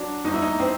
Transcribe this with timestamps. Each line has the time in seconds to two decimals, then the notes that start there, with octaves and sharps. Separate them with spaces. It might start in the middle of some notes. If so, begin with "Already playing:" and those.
Already playing: F#3 D4
0.24 G1 D#4
0.34 E4
0.42 D#4
0.60 C4